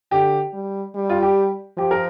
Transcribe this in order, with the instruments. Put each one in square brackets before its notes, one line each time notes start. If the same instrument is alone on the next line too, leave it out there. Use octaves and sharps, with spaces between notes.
[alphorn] D3 [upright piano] G4
[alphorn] G3
G3
[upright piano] F4
G4
[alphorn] F3 [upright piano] G4
[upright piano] A#4